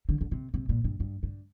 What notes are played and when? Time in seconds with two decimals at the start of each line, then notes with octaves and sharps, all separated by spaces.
0.09 D3
0.21 D3
0.31 C3
0.54 C3
0.69 A#2
0.84 G2
1.00 G2
1.23 G2